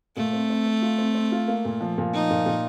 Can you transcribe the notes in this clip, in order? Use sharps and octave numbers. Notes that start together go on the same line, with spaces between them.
A#2 A3
C4
C4
C4
F4
C4
C4
F4
A#3
A#2
F3
A#2
F3 D#4
A#2
A#2